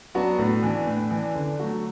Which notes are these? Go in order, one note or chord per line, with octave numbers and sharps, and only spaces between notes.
F#3 B3 D4 F#4
A2
E3 D4
A2
E3 D4
D3
F#3 A3 F#4